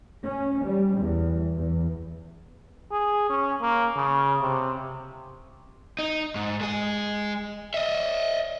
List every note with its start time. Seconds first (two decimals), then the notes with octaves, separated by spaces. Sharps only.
0.24 C#4
0.65 G3
0.99 E2
1.55 E2
2.92 G#4
3.30 C#4
3.62 A#3
3.97 C#3
4.41 C3
5.99 D#4
6.35 G#2
6.61 G#3 G#4
7.74 D#5 E5